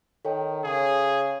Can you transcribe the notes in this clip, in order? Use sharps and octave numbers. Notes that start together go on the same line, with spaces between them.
D#3 A4 C#5 G5
C#3 G#4